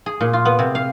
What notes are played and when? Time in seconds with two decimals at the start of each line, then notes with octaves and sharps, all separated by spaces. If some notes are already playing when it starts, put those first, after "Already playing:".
0.06 G#4
0.21 A#2
0.33 F4
0.45 B3
0.59 C3
0.75 F5